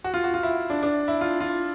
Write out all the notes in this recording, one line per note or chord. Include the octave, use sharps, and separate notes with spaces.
F#4
F4
F#4
F4
E4
D4
D4
E4
F4
F4